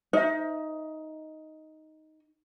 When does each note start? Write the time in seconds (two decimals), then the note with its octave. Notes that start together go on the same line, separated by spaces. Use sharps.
0.13 D#4 C5 E5